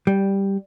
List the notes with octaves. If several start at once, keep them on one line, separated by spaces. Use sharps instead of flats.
G3